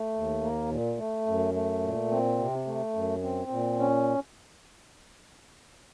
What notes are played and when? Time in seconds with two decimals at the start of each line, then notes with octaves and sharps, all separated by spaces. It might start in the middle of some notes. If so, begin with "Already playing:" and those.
Already playing: A3
0.15 D#2
0.42 A#3
0.71 A#2
0.99 A3
1.27 F#2
1.54 A3
1.83 A#2
2.11 C4
2.39 C3
2.67 A3
2.95 F#2
3.23 C4
3.50 A#2
3.79 C#4